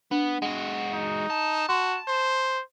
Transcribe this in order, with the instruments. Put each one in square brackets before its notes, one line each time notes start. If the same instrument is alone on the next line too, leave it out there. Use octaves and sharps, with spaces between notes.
[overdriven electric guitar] B3 [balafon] D4
[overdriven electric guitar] G#3 F#4 [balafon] F#5
[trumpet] D#4
[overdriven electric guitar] A5
[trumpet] F#4 [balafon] C6
[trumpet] C5